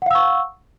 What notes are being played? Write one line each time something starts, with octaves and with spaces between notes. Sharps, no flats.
F5 F#5 C#6 E6